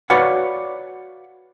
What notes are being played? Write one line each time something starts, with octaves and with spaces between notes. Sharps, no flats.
F#4 B4 C#5 D5 F5 F#5